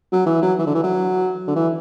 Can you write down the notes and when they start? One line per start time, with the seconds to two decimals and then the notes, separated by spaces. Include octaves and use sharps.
0.12 F#3
0.26 E3
0.42 F#3
0.59 E3
0.66 D3
0.74 E3
0.83 F#3
1.48 D3
1.56 E3